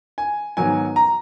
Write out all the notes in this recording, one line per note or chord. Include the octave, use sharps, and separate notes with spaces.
G#5
G#2 D#3 F#3 B3 G#5
A#5